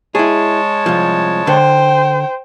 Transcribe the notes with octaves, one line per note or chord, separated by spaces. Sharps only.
G#3 E4 G#4 C#5 A5
C2 F3
D3 C5 G5